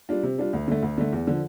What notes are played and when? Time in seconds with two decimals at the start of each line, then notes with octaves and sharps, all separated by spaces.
0.09 G3 D4 F4
0.23 C3
0.38 G3 D4 F4
0.53 D2
0.68 D3 A3
0.83 D2
0.98 D3 A3
1.13 E2
1.27 D3 F3